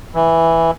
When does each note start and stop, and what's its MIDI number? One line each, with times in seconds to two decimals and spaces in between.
0.15 0.71 52